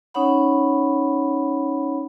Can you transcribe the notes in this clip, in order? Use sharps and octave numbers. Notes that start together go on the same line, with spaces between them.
C#4 D#4 C#5 F#5 B5